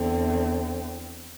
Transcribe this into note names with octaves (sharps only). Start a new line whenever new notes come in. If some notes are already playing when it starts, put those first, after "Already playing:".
Already playing: E2 D3 C4